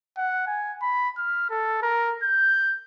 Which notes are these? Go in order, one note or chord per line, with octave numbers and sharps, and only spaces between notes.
F#5
G#5
B5
F6
A4
A#4
G6